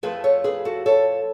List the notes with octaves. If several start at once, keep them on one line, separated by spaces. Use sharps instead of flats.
F2 F3 A3 G#4 B4
A4 C#5
G#4 B4
F#4 A4
A4 C#5